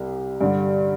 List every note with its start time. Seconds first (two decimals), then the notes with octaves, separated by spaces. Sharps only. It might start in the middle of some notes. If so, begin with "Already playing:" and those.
Already playing: C2 C3
0.41 G2 D3 G3